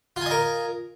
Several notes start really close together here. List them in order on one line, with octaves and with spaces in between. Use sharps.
F4 G#5 D#5 A#4